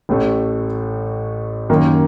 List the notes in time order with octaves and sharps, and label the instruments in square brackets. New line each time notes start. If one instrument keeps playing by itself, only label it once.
[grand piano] A1 A2 A3
F#2 D#3 A#3